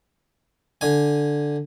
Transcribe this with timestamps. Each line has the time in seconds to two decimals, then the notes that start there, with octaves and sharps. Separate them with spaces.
0.81 D3 G#5